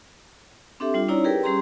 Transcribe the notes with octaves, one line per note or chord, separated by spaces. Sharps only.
C4 D4 G4 A4 E5
G3 D4 F4
C#4 D#4 E4 C#5 D5 A#5
G4 G#4 A#4 B4 G5
G3 C#4 G4 G#4 A#5 C6